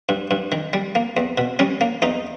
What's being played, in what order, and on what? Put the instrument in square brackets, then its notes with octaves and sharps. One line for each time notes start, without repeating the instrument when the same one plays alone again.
[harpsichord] G2
G2
D#3
G3
A#3
E2
B2
G3 C#4
A#3
E2 D#4